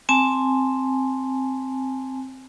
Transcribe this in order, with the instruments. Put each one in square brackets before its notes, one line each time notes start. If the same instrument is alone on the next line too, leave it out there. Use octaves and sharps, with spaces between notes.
[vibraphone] C4 G#5 A5